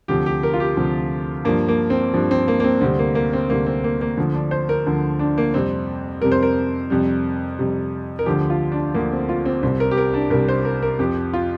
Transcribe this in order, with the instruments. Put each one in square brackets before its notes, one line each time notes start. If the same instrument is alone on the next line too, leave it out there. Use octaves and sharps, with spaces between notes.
[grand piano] D2 C3 F3 G4
G4
A#4
F4
G4
D2 C3 F3
G2 F3 A#3
A#3
C4
G2 F3
C4
A#3
A#3
C4
D2 C3 G3 C4
A#3
A#3
C4
D2 C3 G3 A#3
C4
A#3
A#3
D2 D3 F3
D4
C5
A#4
D2 D3 F3
D4
A#3
F2 C3 G3 C4
F2 C3 G3 A#4
C5
A#4
F2 C3 G3
F2 C3 G3
A#4
D2 D3 F3 G4
F4
D4
D2 D3 F3 A#3
C4
F4
C4
C2 C3 G3 C4
A#4
G4
A#4
D4
C2 C3 G3 A#4
C5
A#4
A#4
F2 F3 G4
F4